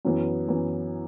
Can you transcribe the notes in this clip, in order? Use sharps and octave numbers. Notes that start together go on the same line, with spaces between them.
F#2 E3 B3
F#2 E3 B3